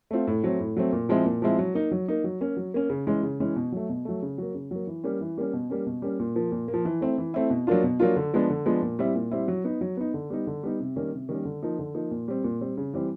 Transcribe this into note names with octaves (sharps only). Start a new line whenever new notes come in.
A3 C4 F4
A2
F#3 A3 C4
A2
F#3 A3 C4
A#2
F3 G#3 C4 E4
A#2
F3 G#3 C4 E4
F#3
A#3 D#4
F#3
A#3 D#4
F#3
A#3 C#4
F#3
A#3 C#4
C#3
E3 G#3 C#4
C#3
E3 G#3 C#4
B2
F#3 A3
B2
F#3 A3
C#3
F#3 A#3
C#3
F#3 A#3
E3
G3 A#3 C#4
E3
G3 A#3 C#4
B2
G3 A#3 C#4
B2
G3 A#3 C#4
A#2
F3 A#3
A#2
A#3
F3
E3
A3 C4 E4
E3
A3 C4 E4
B2
F#3 A#3 D4 F4
B2
F#3 A#3 D4 F4
D3
F3 G#3 B3 D4
D3
F3 G#3 B3 D4
A#2
G3 C4 E4
A#2
G3 C4 E4
F#3
B3 D#4
F#3
B3 D#4
D3
G3 B3 D#4
D3
G3 B3 D#4
C3
D#3 G3 A#3 C#4
C3
D#3 G3 A#3 C#4
D3
F3 A#3 D#4
D3
F3 A#3 D#4
A#2
G3 C4
A#2
G3 C4
C#3
E3 G3 C4